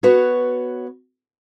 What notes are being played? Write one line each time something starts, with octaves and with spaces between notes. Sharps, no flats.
B3 F#4 B4 C#5